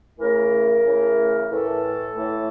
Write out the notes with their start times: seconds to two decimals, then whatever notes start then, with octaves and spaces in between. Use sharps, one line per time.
0.18 C#3 E3 A3 A#4
0.84 C#3 E3 A3
1.49 A2 E3 A3 A4
2.13 A2 E3 A3